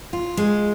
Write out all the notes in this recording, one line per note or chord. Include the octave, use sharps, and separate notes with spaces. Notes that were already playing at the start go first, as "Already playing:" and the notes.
F4
G#3